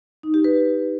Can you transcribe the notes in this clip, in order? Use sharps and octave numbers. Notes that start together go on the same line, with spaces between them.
D#4
G4
B4